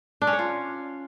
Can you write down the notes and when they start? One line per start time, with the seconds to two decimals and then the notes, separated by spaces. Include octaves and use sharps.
0.22 D4
0.27 C#4
0.33 C#5
0.39 F4